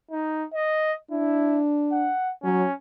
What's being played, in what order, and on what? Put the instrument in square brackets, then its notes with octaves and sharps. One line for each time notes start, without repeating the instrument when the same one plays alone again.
[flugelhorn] D#4
D#5
[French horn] D4 [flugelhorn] E4
[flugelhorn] F#5
[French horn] F#3 [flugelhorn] C#4